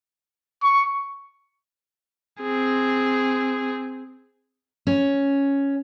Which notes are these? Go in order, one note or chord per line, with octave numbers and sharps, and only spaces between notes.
C#6
C4 G#4
C#4